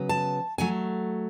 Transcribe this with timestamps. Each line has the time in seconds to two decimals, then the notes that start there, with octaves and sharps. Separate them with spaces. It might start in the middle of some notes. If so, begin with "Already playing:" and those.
Already playing: C#3 F#3 B3
0.09 A5
0.58 C#3 F#3 A3 G#5